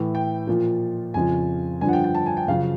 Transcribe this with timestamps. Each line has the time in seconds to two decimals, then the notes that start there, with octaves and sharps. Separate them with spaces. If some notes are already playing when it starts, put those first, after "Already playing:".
Already playing: A2 E3
0.15 G5
0.47 A#2 F3
1.14 F2 C#3 F3 G#5
1.81 G2 D3 F3 G#5
1.88 F#5
1.93 G5
2.04 G5
2.15 A5
2.26 G#5
2.37 G5
2.48 F#2 C#3 F3 F5